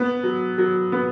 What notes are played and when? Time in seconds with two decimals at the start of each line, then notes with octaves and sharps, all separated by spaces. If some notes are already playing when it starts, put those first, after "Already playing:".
Already playing: B3
0.23 F#3
0.58 F#3
0.92 B3